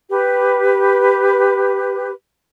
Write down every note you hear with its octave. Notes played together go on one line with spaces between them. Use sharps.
G4 B4